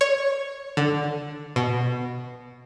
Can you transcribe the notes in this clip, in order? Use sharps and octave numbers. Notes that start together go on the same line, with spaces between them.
C#5
D3
B2